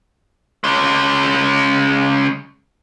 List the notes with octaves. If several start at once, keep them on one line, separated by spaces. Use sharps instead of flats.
C#3 G#3